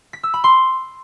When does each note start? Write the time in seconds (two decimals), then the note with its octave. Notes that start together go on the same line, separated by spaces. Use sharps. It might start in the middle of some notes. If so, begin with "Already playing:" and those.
0.13 B6
0.23 E6
0.34 B5
0.44 C6